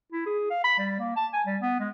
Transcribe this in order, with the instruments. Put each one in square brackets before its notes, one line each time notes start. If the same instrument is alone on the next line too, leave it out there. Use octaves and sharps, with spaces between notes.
[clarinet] E4
G#4
F5
B5
G3
A#3
A5
G#5
G3
B3
G#3